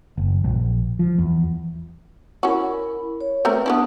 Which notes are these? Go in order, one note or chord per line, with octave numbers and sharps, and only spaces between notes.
F#1
A#1
F3
E2
C#4 E4 F#4 A#4 B5
C#5
A3 C4 A#4 B4
B3 C#4 D4 E4 A5 D#6